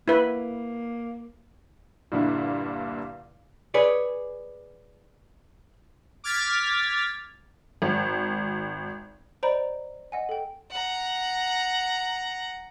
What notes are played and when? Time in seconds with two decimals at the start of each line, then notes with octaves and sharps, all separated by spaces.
0.08 A#3 E4 B4
2.12 G2 A#2 D3 E4
3.74 G#4 B4 C#5 D5
6.24 D6 F6 G#6 A6 B6
7.82 G#1
9.43 C5 D5 D#5 A#5 B5 D7
10.12 D#5 F#5 G#5
10.29 A4 G5
10.71 F#5 A#5